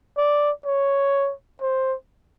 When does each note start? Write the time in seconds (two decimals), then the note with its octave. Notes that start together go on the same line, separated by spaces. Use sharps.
0.18 D5
0.66 C#5
1.61 C5